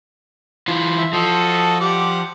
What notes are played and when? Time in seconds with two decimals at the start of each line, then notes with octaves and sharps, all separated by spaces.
0.68 E3 F4
0.97 E5
1.13 F3 F#4 A4 D#5
1.80 G3 F#5 D6